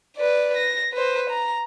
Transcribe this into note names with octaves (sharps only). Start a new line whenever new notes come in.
B4 D5
A#6
B4 C5
A#5